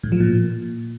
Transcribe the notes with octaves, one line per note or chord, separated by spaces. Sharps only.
A2
F3
A#2